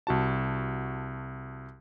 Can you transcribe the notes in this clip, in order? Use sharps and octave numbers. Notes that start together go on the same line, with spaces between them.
C2 F#4 A5